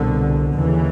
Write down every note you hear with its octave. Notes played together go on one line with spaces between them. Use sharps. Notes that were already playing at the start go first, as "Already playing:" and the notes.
Already playing: C2 B2 D3
D#2 C#3 E3